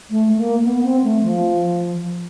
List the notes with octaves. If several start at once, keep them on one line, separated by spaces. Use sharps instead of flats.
A3
A#3
B3
C4
A3
F3